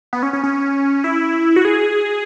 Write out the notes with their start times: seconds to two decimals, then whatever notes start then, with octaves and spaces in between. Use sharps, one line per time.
0.13 B3
0.23 C#4
0.33 C#4
0.43 C#4
1.04 E4
1.56 F#4
1.65 G#4